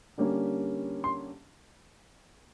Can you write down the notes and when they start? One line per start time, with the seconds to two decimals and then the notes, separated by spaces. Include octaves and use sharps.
0.18 D3 G3 A#3 C#4
1.04 C6